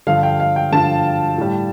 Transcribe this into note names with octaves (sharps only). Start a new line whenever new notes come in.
G2 D3 F3 F5
G5
F5
G5
G2 D3 F3 A5
A2 G3